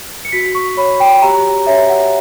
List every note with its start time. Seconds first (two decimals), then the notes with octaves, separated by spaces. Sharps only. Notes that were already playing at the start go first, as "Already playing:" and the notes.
0.25 C#7
0.32 F#4 B6
0.55 C#6
0.77 C#5 B5
1.00 G5
1.22 G4 A#5
1.67 C#5 E5
1.89 F#5